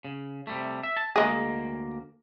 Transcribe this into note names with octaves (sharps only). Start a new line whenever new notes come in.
C#3
C3 G3 A3
E5
A5
D2 G#3 A#3 G#4 A#4